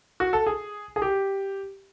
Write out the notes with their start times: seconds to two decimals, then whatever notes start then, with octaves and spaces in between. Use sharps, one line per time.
0.20 F#4
0.33 A4
0.47 G#4
0.96 G#4
1.02 G4